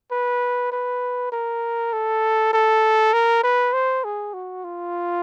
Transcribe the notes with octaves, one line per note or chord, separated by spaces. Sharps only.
B4
B4
A#4
A4
A4
A#4
B4
C5
G#4
F#4
F4